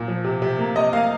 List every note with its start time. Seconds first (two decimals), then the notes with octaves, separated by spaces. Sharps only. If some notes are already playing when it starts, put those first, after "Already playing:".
Already playing: A#2
0.08 F3
0.24 C3
0.42 C3
0.58 A#3
0.76 C3 D#5
0.93 A#3 F5